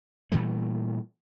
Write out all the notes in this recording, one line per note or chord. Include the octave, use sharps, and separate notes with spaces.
A#2 E3 G3 A3